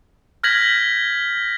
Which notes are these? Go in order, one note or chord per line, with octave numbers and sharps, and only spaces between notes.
F6 G6 G#6 A#6 B6 F#7